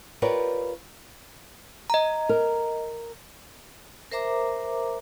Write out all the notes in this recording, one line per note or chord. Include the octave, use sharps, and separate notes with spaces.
F4 G4 A#4 B4 C#5 D5
D#5 A#5
A#4
A#4 C5 E5 A#5 D6